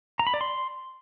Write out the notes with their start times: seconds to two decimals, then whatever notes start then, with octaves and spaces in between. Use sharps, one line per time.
0.19 A#5
0.27 B5
0.34 D5
0.41 C6